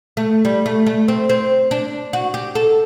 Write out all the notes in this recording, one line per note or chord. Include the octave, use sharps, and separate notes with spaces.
A3
G3
A3
A3
C4
C4
D4
F#4
G4
A4